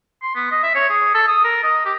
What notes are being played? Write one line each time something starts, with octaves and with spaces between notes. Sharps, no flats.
C6
B3
D#5
E5
C#5
G#4
A4
D#6
A#4
D#5
G4